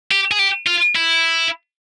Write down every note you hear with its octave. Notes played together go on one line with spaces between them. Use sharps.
G4
G#4
G4
F4
E4